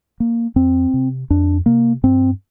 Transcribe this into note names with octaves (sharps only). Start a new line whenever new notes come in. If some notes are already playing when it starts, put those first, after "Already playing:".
A#3
F2 C4
C3
F2 D4
C3 A#3
G2 C4